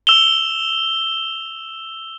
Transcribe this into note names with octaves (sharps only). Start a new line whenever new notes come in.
E6 E7 F7 G7